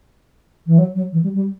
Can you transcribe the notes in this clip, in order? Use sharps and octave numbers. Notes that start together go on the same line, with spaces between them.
E3
F#3
F#3
E3
G3
G3